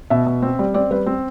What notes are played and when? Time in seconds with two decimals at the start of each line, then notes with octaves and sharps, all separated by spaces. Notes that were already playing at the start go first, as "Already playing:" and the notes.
0.10 B2 E5
0.26 B2
0.42 C4
0.59 G3
0.74 C4 D5
0.91 G3 B4
1.06 C4